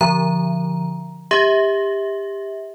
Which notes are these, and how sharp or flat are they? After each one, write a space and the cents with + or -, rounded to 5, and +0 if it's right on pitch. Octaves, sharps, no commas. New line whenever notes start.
D3 -15 F3 +0 A#5 +10
G4 +20 E5 -30